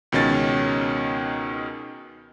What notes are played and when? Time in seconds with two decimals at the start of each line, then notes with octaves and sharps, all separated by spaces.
0.12 C#2 B2 D#3 C#4 A6